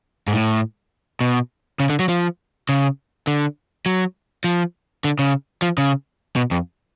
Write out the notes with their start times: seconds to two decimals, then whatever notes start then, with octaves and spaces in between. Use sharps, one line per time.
0.27 G#2
0.33 A2
1.21 B2
1.80 C#3
1.90 D3
1.99 F#3
2.09 F3
2.69 C#3
3.27 D3
3.86 F#3
4.44 F3
5.04 D3
5.19 C#3
5.62 F3
5.78 C#3
6.36 B2
6.51 F2